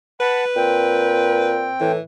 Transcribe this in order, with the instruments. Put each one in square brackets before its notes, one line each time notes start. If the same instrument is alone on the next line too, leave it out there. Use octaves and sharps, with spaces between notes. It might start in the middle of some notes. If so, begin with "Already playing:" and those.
[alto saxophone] B4 [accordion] F#5 A5 B5
[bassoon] A#2 [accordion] C4 G5
[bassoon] A2 [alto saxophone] E3